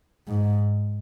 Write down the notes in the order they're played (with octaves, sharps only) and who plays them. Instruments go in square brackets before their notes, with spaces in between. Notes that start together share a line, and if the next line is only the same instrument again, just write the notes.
[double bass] G#2